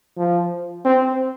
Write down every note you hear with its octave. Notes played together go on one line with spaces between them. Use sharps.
F3
C4